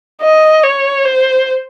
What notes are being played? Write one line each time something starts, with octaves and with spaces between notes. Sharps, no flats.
D#5
C#5
C5